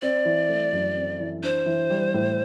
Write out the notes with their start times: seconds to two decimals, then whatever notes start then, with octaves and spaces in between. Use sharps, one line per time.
0.02 C4 D5
0.25 E3
0.49 A3
0.73 F#2
0.96 C4
1.20 E3
1.43 D4 C5
1.66 E3
1.90 G3
2.14 A2